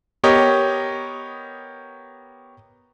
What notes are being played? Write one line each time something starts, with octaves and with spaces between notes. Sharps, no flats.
B3 G4 A#4 C#5 D#5